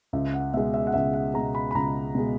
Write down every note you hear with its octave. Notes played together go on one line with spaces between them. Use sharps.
C#2 E5
F#5
B2 G#3 E5
E5
F#5
C#2 E5
F#5
B2 G#3 A#5
B5
B5
C#2 A#5
B2 G#3